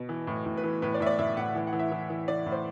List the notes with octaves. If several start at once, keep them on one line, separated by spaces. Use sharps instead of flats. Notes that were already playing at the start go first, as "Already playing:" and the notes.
Already playing: B2
E3
A2
A2
B4
E3
A2 B4
D5
A2 E5
D5
A2 E5
A2 F#5
E3
F#5
E3
E5
E3
E3
E3 D5
A2
C5